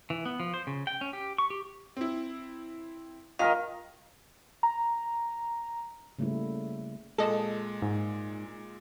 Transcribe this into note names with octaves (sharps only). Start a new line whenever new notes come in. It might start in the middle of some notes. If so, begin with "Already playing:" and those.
E3
B3
F3
C5
C#3
G5
C#4
G4
C#6
G4
C4 E4
D#3 F4 A#4 D#5 F5
A#5
C#3 G3 A3 A#3 E4
A#2 G#3 A4 D#5
G#2